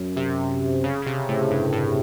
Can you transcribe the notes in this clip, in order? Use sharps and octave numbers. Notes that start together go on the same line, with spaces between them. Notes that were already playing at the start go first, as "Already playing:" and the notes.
Already playing: F#2
C3
C#3
C#3
C3
A2
G2
A2